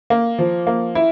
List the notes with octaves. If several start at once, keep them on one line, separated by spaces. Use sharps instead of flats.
A#3
F3
A#3
E4